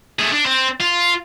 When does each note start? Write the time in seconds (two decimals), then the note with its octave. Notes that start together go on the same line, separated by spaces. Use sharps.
0.19 A3 G#4
0.32 D4
0.45 C4
0.80 F4